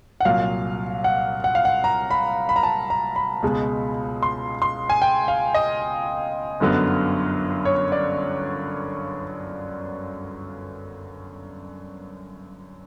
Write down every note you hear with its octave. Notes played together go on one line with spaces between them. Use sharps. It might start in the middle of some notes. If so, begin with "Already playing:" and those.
F#5
C2 A#2 F#3 F5
F#5
F#5
F5
F#5
A#5
B5
B5
A#5
A5
A#5
B5
C#2 B2 G#3
C6
C6
G#5
G5
F5
D#5
G1 F#2 D3 F#3 B3
C#5
D5